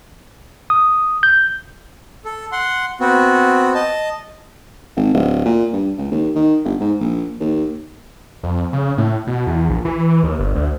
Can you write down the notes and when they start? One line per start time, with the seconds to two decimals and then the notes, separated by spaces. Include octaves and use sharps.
0.70 D#6
1.23 G6
2.24 A4
2.52 F#5 C6
3.00 B3 C4 F#4
3.75 D#5 A5
4.96 G#1
5.13 D1
5.45 A#2
5.73 G2
5.98 C#2
6.11 D#2
6.35 D#3
6.65 G1
6.80 G#2
7.00 A#1
7.40 D#2
8.43 F2
8.73 C#3
8.98 A2
9.27 B2
9.47 E2
9.69 A#1
9.85 E3
10.23 D#2
10.39 G1
10.55 D2